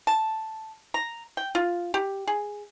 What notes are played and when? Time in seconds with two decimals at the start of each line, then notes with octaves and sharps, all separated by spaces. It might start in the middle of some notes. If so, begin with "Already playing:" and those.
0.07 A5
0.94 A#5
1.37 G5
1.55 F4
1.94 G4
2.27 G#4